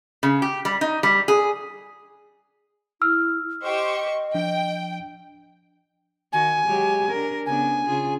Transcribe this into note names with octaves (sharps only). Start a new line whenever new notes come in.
C#3
G4
G3
D#4
G3
G#4
E4 E6 F6
G4 C5 D#5 C#6
F3 D4 G5
D#3 F#4 G#5
F#3 G#3 G4
D4 A#4
C#3 B3 D4 G#5
C#3 F4 G#4